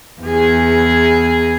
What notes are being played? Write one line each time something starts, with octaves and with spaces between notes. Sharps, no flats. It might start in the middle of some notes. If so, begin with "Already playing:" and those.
E2 G#4